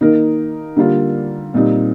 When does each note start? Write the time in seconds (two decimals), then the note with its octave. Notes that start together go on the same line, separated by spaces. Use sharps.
0.01 D#3 A#3 D#4 A#4
0.77 D3 G3 A#3 F4
1.54 A#2 G3 C4 D#4